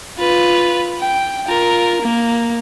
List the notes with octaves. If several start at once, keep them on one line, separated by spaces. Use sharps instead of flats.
F4 B4
G5
F4 A#4
A#3